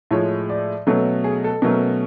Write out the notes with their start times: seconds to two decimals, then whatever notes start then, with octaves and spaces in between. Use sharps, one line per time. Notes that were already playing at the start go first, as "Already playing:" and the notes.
0.11 A2 F3 G#3 C#5
0.49 D5
0.87 B2 F#3 A3 C#4 A4
1.24 G#4
1.44 A4
1.62 B2 F#3 A3 C#4 A#4